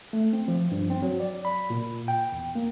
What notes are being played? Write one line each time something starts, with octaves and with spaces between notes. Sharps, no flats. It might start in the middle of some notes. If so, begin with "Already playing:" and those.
A3
C4
F3
G2
C4
F#3
D5
B5
A#2
G5
E2
A#3